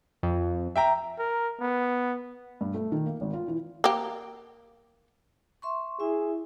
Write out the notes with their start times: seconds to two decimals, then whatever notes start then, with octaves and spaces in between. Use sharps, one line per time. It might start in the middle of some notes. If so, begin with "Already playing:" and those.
0.23 F2
0.76 E5 G5 A#5
1.18 A#4
1.60 B3
2.61 G2
2.74 A3
2.92 D#3
3.06 A#3
3.21 G#1
3.33 F4
3.48 E3
3.84 A#3 G4
5.62 E5 C6 C#6
6.00 E4 G#4 E5